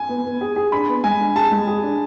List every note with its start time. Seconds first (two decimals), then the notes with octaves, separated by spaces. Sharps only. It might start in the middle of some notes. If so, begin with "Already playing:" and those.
Already playing: G#5
0.08 B3
0.25 B3
0.41 G#4
0.56 G#4
0.72 D4 B5
0.88 B3
1.04 G#3 G#5
1.20 D4
1.35 G#4 A5
1.51 G#3
1.67 G#4
1.83 D4